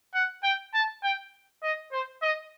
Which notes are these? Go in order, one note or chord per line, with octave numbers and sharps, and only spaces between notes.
F#5
G5
A5
G5
D#5
C5
D#5